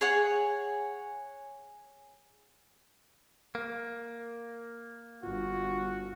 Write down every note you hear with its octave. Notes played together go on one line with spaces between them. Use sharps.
G#4 C#5 F#5
A#3
G1 G2 F4 F#4